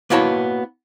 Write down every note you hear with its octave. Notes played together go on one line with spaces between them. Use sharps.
A#3 B3 E4 F#4 C#5 A5